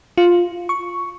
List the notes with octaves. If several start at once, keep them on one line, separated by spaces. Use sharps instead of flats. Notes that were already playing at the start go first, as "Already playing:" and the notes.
F4
C#6